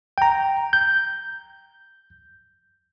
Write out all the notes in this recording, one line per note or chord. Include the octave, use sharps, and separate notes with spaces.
G5 A#5
G6